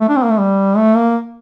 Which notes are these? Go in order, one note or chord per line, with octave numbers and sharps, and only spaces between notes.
A3
D4
C4
A#3
A3
G3
A3
A#3